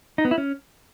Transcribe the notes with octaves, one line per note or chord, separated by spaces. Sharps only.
D#4
B3
E4
C#4